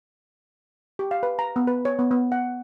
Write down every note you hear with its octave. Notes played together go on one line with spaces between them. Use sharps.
G4
F5
B4
A#5
B3
B4
C#5
B3
B3
F#5